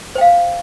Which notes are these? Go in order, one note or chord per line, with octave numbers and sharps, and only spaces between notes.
C5 F5 G5